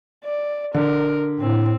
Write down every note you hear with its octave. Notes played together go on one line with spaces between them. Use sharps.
D5
D3 A#4
A2 C4